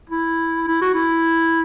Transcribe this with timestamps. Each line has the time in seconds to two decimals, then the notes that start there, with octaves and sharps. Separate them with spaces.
0.10 E4
0.68 E4
0.81 F#4
0.94 E4